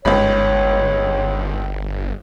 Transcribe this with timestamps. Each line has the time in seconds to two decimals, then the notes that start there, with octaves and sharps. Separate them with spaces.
0.05 G1 C#2 G#2 C#5 B5